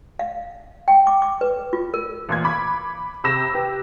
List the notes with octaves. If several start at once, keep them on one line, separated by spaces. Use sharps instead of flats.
F5
G5
D6
D6
B4
F4
A#4
A1 A#2 C6 G#6
B5 D6
C3 B5 E6 A#6 E7
G4 B4